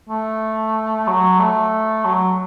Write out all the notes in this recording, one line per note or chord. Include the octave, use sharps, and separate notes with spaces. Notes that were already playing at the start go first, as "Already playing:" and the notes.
A3
F#3
A3
F#3